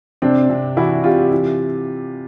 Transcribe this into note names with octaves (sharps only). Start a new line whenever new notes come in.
C3 C4 D4
C3
E3 E4 F#4
C3 F4 G4
E3